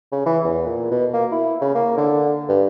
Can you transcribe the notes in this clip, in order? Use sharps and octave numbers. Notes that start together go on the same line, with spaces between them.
C#3
E3
E2
A#2
B2
A#3
E4
C#3
A#3
D3
G2